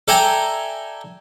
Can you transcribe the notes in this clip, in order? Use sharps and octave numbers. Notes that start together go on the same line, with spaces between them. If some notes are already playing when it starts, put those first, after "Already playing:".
A4 D5 E5 G5 G#5 A#5